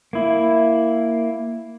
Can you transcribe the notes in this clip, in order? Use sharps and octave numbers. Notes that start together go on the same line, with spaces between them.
A#3 E4